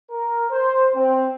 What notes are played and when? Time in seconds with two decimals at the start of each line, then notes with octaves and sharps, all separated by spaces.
0.10 A#4
0.50 C5
0.95 C4